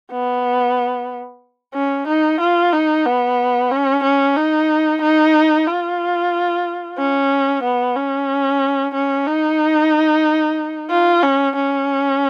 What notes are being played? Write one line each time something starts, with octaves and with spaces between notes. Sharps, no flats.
B3
C#4
D#4
F4
D#4
B3
C#4
C#4
D#4
D#4
F4
C#4
B3
C#4
C#4
D#4
F4
C#4
C#4